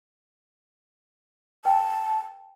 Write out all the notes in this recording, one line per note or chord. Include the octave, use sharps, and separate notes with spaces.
B4 G5 A5